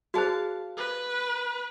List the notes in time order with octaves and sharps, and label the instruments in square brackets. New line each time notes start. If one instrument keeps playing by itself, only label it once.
[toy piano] F#4 G#4 C5 [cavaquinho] F5 A5
[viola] B4